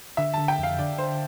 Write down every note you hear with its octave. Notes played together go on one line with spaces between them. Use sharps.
D3 E5
D3 A5
G5
F2 F5
D3 D5
D3 C5